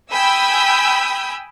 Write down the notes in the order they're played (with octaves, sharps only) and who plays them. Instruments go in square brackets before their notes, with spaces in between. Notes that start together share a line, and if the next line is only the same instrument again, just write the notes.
[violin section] G5 G#5 B5 D#6 E6 G6